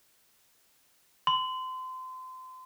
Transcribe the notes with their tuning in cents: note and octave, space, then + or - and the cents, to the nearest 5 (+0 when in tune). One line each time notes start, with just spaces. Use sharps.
C6 -30